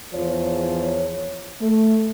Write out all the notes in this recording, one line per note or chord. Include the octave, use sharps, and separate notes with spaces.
E2 F3 C#5
A3